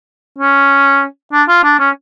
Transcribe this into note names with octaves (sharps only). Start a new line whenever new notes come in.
C#4
D4
F4
D4
C#4